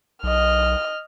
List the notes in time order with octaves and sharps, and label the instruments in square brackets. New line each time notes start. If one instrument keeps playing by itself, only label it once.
[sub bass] B1 [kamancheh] D#5 F6